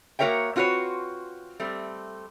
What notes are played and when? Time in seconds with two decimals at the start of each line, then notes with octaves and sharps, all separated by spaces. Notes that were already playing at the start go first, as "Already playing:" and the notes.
0.19 A#3 F#4 A#4 C#5 E5 G5
0.56 C4 F4 F#4 B4 C#5
1.60 G3 A3 C4